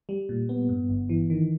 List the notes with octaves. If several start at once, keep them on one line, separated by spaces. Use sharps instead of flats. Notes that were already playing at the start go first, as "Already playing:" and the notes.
G3
A#2
B3
G2
G1
E3
D#3